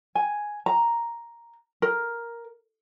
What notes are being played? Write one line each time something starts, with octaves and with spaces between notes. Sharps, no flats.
G#5
A#5
A#4